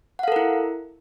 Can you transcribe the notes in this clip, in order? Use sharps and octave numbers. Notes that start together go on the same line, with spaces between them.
E4 A4 A#4 F5 F#5